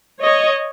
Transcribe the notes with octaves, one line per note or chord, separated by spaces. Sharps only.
C#5 D#5